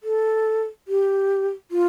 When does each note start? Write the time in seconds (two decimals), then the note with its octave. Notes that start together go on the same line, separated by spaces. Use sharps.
0.04 A4
0.88 G4
1.71 F4